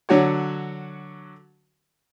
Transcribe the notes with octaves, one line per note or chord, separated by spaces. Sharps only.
D3 F#3 F#4 C#5